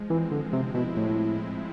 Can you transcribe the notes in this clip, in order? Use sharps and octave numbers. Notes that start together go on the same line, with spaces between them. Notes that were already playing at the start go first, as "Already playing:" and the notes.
Already playing: F3 G#3
E3 C4
D3 F3
C3 C4
B2 E4
A2 G#3
F3
C4